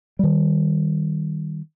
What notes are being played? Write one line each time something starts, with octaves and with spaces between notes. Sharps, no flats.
D#3 G3